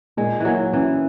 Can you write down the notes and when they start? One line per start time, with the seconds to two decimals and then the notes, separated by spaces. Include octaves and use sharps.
0.17 A#2 G#3
0.40 E3 F#3 A#3
0.73 E3 C#4